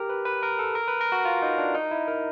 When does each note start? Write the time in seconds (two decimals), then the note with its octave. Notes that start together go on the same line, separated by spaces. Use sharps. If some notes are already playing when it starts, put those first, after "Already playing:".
Already playing: G4 A#4
0.09 B4
0.25 B4
0.43 A#4
0.59 A4
0.75 A#4
0.88 B4
1.01 A#4
1.12 F#4
1.25 F4
1.42 D#4
1.58 D4
1.74 D#4
1.91 E4
2.08 A#4